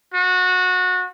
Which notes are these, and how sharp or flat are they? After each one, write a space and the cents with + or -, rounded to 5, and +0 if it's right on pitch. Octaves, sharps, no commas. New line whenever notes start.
F#4 -20